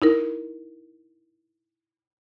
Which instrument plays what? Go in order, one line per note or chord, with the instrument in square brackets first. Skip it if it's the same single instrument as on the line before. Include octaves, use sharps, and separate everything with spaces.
[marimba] D#4 E4 A#4